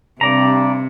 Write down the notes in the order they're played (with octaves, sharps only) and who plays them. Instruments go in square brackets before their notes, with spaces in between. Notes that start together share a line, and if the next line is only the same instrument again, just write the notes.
[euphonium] G2 [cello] C3 [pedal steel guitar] D5 A#5